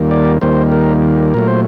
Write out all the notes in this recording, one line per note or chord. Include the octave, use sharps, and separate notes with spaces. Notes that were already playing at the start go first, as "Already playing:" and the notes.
Already playing: D#2 D#3 G3 A#3
D5
D#2 D#3 G3 A#3 C5
A#4
A#2 F#3 A3 A#4
C5